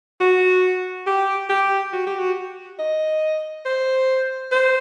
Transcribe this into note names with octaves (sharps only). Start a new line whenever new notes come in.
F#4
G4
G4
F#4
G4
F#4
D#5
C5
C5